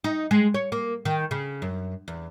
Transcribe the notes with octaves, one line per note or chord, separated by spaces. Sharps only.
D#4
G#3
C#5
A#3
D#3
C#3
F#2
E2